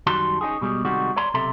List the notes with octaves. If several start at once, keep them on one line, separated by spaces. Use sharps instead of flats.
F#2 D#3 G3 F#4 A5 C6
C#4 D#4 F#4 G#4
B2 G3 G#3
C3 D#3 G3 G#3 F#4
C#5 D5 A#5 C6
B1 C3 A4 E5 A#5 C6